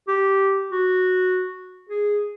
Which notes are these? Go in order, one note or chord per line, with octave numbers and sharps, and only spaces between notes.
G4
F#4
G#4